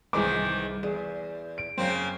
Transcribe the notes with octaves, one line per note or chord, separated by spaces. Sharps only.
C2 G#2 D#3 E3 G#4 D6
E2 G#4
D7
F#2 C#3 A#3 C4